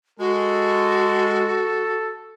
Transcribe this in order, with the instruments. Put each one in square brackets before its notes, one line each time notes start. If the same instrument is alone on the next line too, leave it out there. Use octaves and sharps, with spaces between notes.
[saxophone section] G#3 [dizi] F#4 [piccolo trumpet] A4